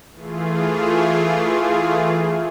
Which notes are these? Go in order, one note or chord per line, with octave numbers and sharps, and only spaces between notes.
E3 A3 F4 G#4